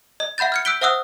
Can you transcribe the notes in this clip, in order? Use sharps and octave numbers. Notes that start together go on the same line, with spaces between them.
D#5
E5 F#5 B5 G6 A6
F6 G#6 C#7
E6 F#6 G6 B6 D7 G7
C5 E5 F#5 D#6 E6 F#6